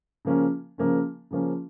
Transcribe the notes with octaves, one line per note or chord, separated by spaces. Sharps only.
C#3 F3 A#3 C#4
C#3 F3 A#3 C#4
C#3 F3 A#3 C#4